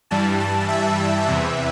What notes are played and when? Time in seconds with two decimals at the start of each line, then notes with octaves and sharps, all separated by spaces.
0.11 G2 E3 G3 A5
0.40 A5
0.68 E5
1.26 E2 C3 E3